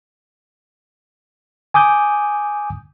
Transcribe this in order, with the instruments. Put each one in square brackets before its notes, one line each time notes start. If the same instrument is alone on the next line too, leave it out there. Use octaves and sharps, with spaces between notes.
[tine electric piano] G#5 D6 D#6 G6